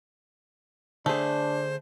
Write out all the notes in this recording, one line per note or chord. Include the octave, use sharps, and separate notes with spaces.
D3 A3 D4 G#4 C5